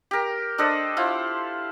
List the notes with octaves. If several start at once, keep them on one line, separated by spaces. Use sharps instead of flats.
G4 A#4
D4 A4 C5 D#5
E4 F4 C5